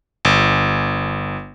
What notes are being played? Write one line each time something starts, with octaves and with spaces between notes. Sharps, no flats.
G1